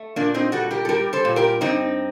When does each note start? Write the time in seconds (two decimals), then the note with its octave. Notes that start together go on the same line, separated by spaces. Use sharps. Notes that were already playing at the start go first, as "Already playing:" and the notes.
Already playing: A3
0.16 A#2 A#3 D4
0.34 C4 D#4
0.52 G3 F#4 A4
0.71 G4 A#4
0.85 A4
0.89 G3 G4 A#4
1.13 A4 C5
1.25 A#2
1.36 G4 A#4
1.61 G2 C4 D#4